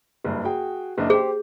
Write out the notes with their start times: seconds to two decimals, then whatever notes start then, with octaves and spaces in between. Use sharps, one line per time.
0.24 F#1 G2
0.44 F#4 G#4 G5
0.98 F#1 D4 D#5
1.10 G4 G#4 C5